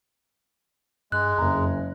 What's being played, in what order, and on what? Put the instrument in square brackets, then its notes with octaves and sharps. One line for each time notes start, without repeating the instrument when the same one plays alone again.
[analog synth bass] G2 [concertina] G#3 [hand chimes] F#6
[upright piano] F#1 A#5 [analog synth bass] F2